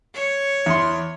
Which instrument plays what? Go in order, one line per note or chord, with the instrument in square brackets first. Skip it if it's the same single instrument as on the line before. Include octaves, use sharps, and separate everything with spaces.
[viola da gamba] C#5
[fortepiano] E2 C6